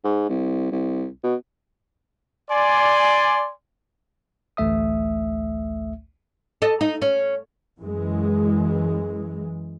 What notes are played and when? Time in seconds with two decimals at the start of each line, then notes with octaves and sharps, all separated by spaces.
0.05 G#2
0.29 C2
0.72 C2
1.23 B2
2.51 D5 G#5 C6
4.57 A1 D2 A3 E5 D#6
6.62 A4 D#5
6.81 D#4
7.02 C#4
7.79 F#2 E3 G#3